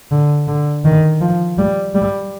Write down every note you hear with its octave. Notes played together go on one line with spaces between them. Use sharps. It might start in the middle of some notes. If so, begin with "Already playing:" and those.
D3
D3
D#3
F3
G3
G3